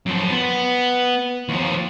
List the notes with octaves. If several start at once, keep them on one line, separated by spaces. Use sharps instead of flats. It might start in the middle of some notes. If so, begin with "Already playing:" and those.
F#2 F3
B3
D#2 F3